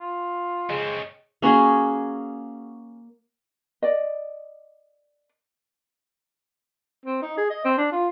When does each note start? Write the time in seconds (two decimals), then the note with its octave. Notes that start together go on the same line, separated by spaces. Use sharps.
0.01 F4
0.70 C#3 G#3 C4
1.42 A#3 C#4 F#4 G#4
3.82 D5 D#5
7.06 C4
7.22 D#4
7.37 G#4
7.50 D#5
7.65 C4
7.78 D4
7.92 F4